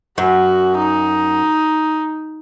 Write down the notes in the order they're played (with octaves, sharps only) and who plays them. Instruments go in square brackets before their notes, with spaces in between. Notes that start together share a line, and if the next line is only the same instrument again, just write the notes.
[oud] F#2 [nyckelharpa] F#4
[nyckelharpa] D#4